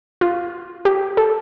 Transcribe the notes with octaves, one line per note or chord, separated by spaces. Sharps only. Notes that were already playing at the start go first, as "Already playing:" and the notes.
F4
G4
A4